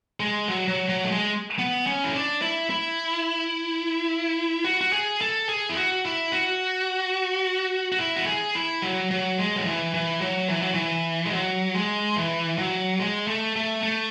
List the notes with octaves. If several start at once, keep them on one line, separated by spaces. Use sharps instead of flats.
G#3
F#3
F#3
F#3
A3
G#3
B3
C#4
E4
D4
E4
E4
F#4
F#4
G#4
A4
G#4
E4
F#4
E4
F#4
F#4
E4
F#4
G#4
E4
F#3
F#3
G#3
F#3
E3
E3
F#3
E3
F#3
E3
G#3
F#3
G#3
E3
F#3
G#3
A3
A3
A3